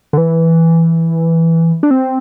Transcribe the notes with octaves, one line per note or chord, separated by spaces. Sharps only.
D3
E3
D4
C4